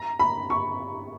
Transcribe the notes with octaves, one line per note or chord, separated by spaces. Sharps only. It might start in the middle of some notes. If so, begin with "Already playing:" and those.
Already playing: A#5
B5
C#6